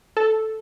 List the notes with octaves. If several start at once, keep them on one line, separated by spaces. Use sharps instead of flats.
A4